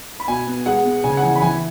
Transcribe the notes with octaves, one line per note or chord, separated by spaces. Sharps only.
B5
B2 G#5
B3
G#3 F#5
B3
C#3 G#5
F#5
E3 G#5
B5
E3 G#5